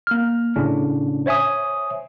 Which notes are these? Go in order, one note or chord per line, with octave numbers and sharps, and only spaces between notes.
A#3 F6
A2 C#3 C#4 D4
C5 C#5 E5 G#5 D#6